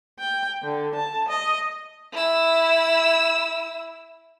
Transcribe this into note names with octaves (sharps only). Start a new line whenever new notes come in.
G5
D3
A5
D#5
E4 E6